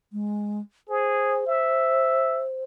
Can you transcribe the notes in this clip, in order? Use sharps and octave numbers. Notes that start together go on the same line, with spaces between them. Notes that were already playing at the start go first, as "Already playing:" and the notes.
G#3
G#4 C5
E5